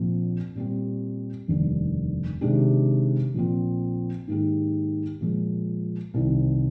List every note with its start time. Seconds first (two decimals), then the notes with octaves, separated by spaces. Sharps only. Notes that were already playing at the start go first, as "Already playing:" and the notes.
Already playing: A#1 A#2 F3 C4
0.55 A#2 G3 C4 G4
1.48 F1 D#2 D3 G3
2.41 C3 D#3 G#3 D4 G4
3.34 A#1 A#2 F3 C4
4.27 G#2 D#3 A#3 D#4 G4
5.21 A#2 F3 G#3
6.14 C2 C3 D#3